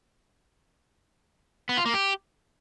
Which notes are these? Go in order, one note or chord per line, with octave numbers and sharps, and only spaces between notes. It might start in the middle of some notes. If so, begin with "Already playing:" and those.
B3
F4
A#3
G4